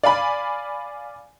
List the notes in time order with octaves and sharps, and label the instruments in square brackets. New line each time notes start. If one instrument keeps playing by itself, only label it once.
[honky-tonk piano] D5 F5 G#5 B5